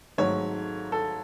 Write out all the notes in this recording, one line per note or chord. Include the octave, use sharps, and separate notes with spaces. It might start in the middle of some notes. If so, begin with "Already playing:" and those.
G#1 G#2 F#3 A3 C#5
A4